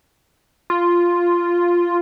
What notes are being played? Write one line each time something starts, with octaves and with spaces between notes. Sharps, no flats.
F4